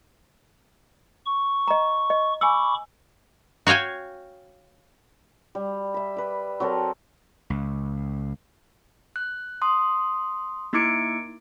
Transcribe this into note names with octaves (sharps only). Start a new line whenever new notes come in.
C#6
D#5 A#5
D#5
G#5 B5 C#6 D6 E6
F#4 C#5 F5 G5 G#5
G3
E5 B5
B4 D6
F#3 C4 A4 A#4
C#2
F#6
C6 D#6
A#3 D#4 E4 D6 C#7 D7